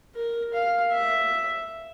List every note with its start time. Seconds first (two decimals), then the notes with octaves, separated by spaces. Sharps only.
0.16 A#4
0.53 F5
0.92 E5